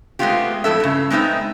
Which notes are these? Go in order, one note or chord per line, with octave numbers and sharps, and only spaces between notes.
G#3 A3 B3 C4 F4 G4
F2 A2 A4 E5
G2 C#3
G#3 B3 C4 D#4 E5